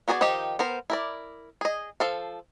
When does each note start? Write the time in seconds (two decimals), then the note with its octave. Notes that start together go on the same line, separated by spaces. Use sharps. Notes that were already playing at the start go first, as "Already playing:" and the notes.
0.08 B3 F#4 G#4 C5 D5
0.21 D#3 F3 D#4 G4
0.59 B3 A#4 C5
0.90 E4 A#4 D5
1.61 G#4 D#5
2.00 F3 A4 F5